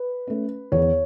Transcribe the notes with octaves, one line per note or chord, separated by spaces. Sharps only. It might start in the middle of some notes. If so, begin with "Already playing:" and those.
Already playing: B4
A3 C#4
E2 C#5